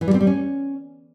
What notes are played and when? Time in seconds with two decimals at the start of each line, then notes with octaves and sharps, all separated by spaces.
0.01 E3
0.08 G3
0.14 C4
0.21 G3
0.27 C#4